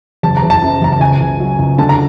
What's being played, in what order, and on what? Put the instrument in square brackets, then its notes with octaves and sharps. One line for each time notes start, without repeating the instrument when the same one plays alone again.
[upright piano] F#1 A5
A#5
F#1
A5
F#2
F#1 A#5
A5
C#2 G#5
C#2
F#3
C#2
D3 A5
A#5